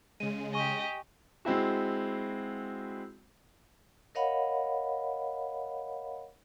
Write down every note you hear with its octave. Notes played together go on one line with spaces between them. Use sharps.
C#3 G#3 D#7
G4 D#5 G#5 C#6
G#3 C4 E4 F#4
A#4 C#5 D#5 F5 F#5 B5